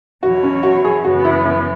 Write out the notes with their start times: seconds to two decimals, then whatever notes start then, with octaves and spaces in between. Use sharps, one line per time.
0.23 E2 B2 F#3 E4 F#4 C#5
0.43 C#4
0.63 F#4
0.84 G#4
1.04 F#2 C#3 E3 B3 F#4
1.25 E4
1.45 E4